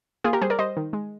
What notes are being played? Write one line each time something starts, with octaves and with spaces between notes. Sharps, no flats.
A#3 F4 G#4
G4 A#4
G3 G#4 C5
A#4 D5
G3 C5 D#5
D#3
G#3